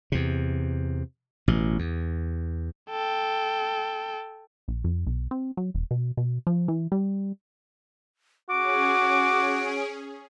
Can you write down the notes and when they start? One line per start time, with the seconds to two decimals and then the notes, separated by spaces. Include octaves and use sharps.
0.12 E2 C3
1.48 A1 B2
1.79 E2
2.90 A4 G5
4.68 A#1
4.84 F2
5.07 B1
5.31 C4
5.57 F#3
5.74 E1
5.91 B2
6.17 B2
6.47 F3
6.68 E3
6.92 G3
8.50 C#4 F#4 G#4 D6 D7